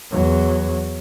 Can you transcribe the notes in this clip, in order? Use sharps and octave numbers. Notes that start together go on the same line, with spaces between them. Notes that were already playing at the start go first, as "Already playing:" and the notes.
E2 F#3